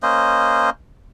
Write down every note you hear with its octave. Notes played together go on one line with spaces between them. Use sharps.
A#3 C#4 C5 D#5